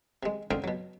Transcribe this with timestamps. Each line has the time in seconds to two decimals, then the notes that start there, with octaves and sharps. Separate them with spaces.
0.23 C3 G#3
0.51 C#2 D3 C4 A#4 F5 D#6
0.64 B2 F#3